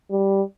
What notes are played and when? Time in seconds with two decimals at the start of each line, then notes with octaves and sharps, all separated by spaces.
0.10 G3